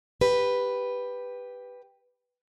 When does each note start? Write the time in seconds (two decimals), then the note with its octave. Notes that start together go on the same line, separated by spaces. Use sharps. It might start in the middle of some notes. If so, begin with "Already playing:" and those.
0.21 G4 B4